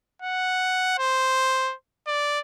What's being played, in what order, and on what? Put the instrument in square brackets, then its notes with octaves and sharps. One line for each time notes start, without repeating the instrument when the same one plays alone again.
[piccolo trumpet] F#5
C5
D5